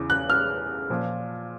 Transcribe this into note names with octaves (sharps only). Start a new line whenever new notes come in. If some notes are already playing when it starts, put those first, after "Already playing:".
Already playing: E2 C#3 E3
F#6
F6
A#2 F3